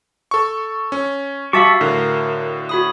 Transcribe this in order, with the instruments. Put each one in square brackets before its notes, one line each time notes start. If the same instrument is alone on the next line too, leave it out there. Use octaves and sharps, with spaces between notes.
[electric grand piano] A4 C#6
C#4
[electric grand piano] G3 D6 [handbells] F#4 F5 [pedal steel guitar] E5 A5 C#6
[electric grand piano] A2 D3 [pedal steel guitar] A#4
[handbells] F#4 B5 D#6